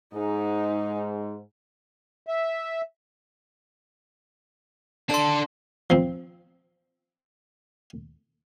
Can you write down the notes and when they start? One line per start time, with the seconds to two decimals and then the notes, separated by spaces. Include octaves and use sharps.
0.14 G#2 D#4
2.27 E5
5.09 D4 A4 A5 C6
5.90 F3 C4